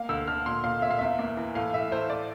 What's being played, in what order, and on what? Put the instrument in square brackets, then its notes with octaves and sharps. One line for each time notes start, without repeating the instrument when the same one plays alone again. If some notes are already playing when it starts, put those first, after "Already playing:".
Already playing: [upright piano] A#3 F5
D2 E6
D3 F6
A#2 C6
A#2 F5
A#2 E5
F5
E2 E5
A#3
E3
A2 F5
A2 E5
A2 C5
D5